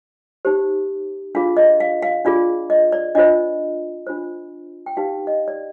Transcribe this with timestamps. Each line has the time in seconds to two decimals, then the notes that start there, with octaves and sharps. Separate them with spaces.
0.45 D#4 G4 C5
1.35 D4 F4 G#4 F5
1.57 D#5
1.80 F5
2.02 F5
2.25 D4 F4 G#4 D5
2.70 D#5
2.92 D5
3.15 D4 F4 C5 D#5
4.07 D4 F4 C5
4.86 G5
4.97 D#4 G4 B4 F5
5.27 D#5
5.48 D5